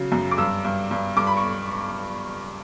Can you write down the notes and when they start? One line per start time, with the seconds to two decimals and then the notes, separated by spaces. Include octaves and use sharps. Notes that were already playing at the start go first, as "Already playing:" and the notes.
Already playing: C#3 F#3
0.12 F#2
0.31 D6
0.38 G2 E6
0.64 G2
0.91 G2
1.17 G2 D6
1.27 B5
1.37 C#6